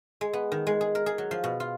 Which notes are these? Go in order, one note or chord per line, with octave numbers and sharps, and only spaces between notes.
G#3
B3
D#3
G#3
G#4
A#4
G#4
F#3
F3
B2
F4